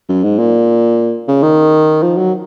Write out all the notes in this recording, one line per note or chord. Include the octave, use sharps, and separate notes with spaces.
F#2
G#2
A#2
C#3
D#3
F3
F#3